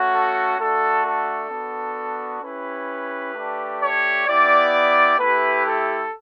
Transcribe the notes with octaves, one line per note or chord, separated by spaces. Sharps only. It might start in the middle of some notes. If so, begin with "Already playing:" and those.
Already playing: A3 C#4 F#4
A4
A3 D4 F#4 A4
A4
B3 D4 F#4
C#4 E4 G4 B4
A3 D4 G4
C#5
B3 E4 G4 D5
A3 E4 G4 B4
A4